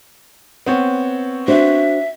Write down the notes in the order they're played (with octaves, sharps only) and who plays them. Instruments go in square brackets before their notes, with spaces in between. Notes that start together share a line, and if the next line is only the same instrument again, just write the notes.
[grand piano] B3 C4 C#5
[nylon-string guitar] D4 F#4 C5 [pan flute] E5